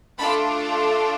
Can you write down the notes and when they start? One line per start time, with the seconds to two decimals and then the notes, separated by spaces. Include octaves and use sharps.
0.19 A3 D4 F4 A4 A5 B5